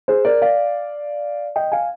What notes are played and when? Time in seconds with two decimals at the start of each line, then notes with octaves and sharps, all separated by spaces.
0.08 G#4 C5
0.25 A#4 D5
0.42 D5 F5
1.56 D#5 G5
1.72 F5 G#5